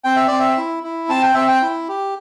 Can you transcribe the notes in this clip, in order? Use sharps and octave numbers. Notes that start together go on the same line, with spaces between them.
C4 G5
E5
C4 D5
E5
E4
E4
C4 A5
G5
C4 E5
G5
E4
G4